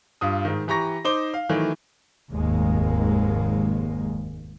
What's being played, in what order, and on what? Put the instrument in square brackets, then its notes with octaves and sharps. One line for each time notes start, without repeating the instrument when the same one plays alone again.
[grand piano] G2 F4 D#6
G#2 D#3
E3 G4 A#5 C#6 A#6
D#4 C5 D6 G7
F5
D#3 E3 F#3 A3
[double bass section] F1 D#2 G#2 G#3 A#3